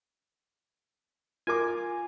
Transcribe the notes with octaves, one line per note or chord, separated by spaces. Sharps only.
F4 A#4 G#5 D6